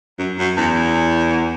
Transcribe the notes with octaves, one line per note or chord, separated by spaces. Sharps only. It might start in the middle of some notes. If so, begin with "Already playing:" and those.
F#2
F#2
E2